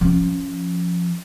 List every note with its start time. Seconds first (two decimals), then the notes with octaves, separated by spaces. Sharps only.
0.01 F3 C#4